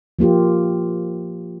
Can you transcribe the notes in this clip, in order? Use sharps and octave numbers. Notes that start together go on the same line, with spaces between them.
F3 A#3 F4 G4